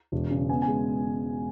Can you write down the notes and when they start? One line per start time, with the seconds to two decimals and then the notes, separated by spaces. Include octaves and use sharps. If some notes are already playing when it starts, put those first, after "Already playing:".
0.12 E1
0.30 C#3
0.49 B3 G#5
0.62 G#5
0.68 G#3